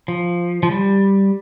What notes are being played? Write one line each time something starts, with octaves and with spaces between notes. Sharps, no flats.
F3
F3
G3